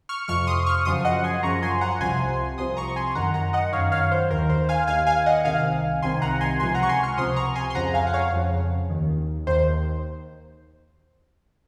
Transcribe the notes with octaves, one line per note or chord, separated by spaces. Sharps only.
C#6 F6
F2 C3 F3 C#6 F6
C6 D#6
C#6 F6
F#2 C#3 F3 C6 D#6
D#5 F#5
G#5 C6
F#2 C#3 F3 A#5 C#6
G#5 C6
F#5 A#5
C2 C3 F3 G#5 C6
C2 C3 F3 C6 D#6
A#5 C#6
G#5 C6
F#2 D#3 F#5 A#5
F#5 A#5
D#5 F#5
F#2 D#3 C#5 F5
C#5 F5
C5
D#2 D#3 A#4
C5
F5 G#5
D#2 D#3 F5 G#5
F5 G#5
D#5 F#5
C2 C3 D#3 F5 G#5
C2 C3 D#3 G#5 C6
F#5 A#5
G#5 C6
C#2 C3 F3 G#5 C6
F#5 A#5
C#6
G#5 C6
C#6 F6
C#2 C3 F3 C6 D#6
A#5 C#6
G#5 C6
C6
F2 C#3 F3 F#5 A#5
F5 G#5
F#5
C#5 F5
F2 C#3 F3
D#2 D#3
D#2 D#3 C5